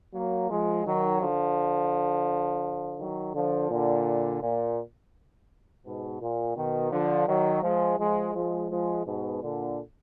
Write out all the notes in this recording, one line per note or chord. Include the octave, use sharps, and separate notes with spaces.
F#3 A#3
F3 G#3
D#3 F#3
D3 F3
D#3 F#3
D3 F3
A#2 D3
A#2
G#2 B2
A#2
B2 D#3
D3 F3
D#3 F#3
F3 G#3
F3 G#3
F3 G#3
F3 G#3
G#2 B2
A#2 D3